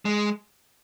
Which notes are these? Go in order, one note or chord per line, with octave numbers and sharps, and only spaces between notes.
G#3